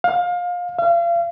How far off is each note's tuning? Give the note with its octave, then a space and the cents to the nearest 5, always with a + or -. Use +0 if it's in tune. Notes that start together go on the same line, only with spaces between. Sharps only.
F5 +25
F5 -35